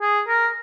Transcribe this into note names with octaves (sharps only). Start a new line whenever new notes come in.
G#4
A#4